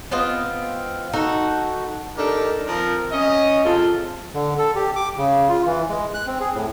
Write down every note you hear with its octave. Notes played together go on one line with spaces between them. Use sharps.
B3 C4 F4 D#5
D#4 F#4 A4
D4 D#4 G4 A4 A#4
F3 C4 A#4
C#4 D#5
C3 F3 G#3 F4 A4
D3
A4
G4
D6
C#3
F4
E3
G#3
F#6
C4
G#4
A2